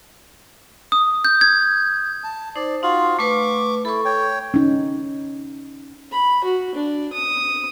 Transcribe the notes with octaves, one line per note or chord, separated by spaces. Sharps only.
D#6
G6
G#6
A5
D#4 C5 D5
D#4 F4 F#4 F5
A3 B4 C#6 D6
E4 A4 C#6
C#5 G5
C#4 D#4
B5
F#4
D4
D#6